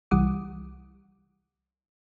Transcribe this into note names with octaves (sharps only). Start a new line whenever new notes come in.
C2 E3 G3 F#5 D6 D#6